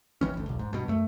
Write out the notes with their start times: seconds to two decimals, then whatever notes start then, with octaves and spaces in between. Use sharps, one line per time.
0.21 A1 D#3 E3 C#4
0.34 G1 D2
0.46 E1 B1
0.59 G#2
0.73 G2 B2
0.88 F#2 A3